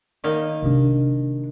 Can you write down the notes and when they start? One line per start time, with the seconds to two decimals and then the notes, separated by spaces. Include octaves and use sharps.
0.24 D#3 A#3 D#5
0.62 C3 D4